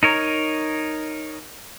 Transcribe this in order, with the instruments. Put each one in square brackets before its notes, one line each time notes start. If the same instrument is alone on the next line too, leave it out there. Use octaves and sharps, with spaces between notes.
[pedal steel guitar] D#4 A#4 C#5